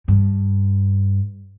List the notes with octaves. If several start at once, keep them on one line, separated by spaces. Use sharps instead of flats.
G2